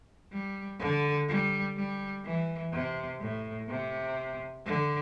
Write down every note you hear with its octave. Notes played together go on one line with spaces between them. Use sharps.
G3
D3
G3
G3
E3
C3
A2
C3
D3